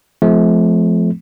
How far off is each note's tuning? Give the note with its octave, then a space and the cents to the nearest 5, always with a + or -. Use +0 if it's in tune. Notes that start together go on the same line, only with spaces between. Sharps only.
F3 +0 A3 -40 C4 -45